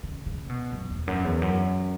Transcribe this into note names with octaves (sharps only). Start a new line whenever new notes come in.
C#3
C#3
B2
F#2
E2
F#2
E2
F#2